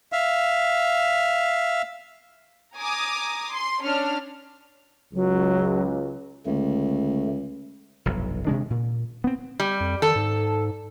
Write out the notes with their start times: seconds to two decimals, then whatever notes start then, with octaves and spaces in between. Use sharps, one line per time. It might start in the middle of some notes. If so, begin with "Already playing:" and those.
0.12 E5 F5
2.78 G#5 A#5 D6 D#6
3.53 C6
3.85 C#4 D4 F6
5.14 C#2 F#3
6.46 C#2 D3 A3
8.06 F1 B1 G2
8.47 C3 D#3 G#3 D4
8.70 A#2
9.24 B3 C4
9.60 G3
9.80 F2
10.02 D#3 A4
10.15 G#2